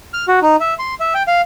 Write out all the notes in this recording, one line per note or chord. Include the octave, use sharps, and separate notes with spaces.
F6
F#4
D#4
E5
C6
E5
G5
F5